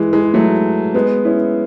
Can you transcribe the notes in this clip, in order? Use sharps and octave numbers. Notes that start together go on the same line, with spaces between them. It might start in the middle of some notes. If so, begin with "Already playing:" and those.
Already playing: E3 G#3
E3 G#3
F#3 A3
G#3 B3
C#4 E4